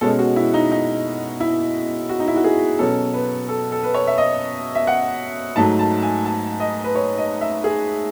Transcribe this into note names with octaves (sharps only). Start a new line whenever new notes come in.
B2 G#3 C#4 A4
F#4
E4
D#4
D#4
E4
F#4
D#4
E4
F#4
G#4
B2 F#3 C#4 A4
B4
A4
A4
B4
C#5
E5
D#5
E5
F#5
G#2 F#3 A3 A5
A5
G#5
A5
D#5
B4
C#5
D#5
E5
G#4